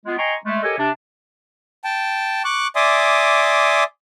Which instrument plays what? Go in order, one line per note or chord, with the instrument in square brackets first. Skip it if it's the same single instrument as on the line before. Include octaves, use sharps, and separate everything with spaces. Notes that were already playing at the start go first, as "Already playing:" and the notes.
[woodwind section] G#3 B3 F4
D#5 G5 G#5 A#5 C6 C#6
G#3 A3
G4 A4 A#4 C#5 D#5 G#5
C3 D4
[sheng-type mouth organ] G5 A5
C#6 D6 F#6
D5 E5 G#5 C6 D6 D#6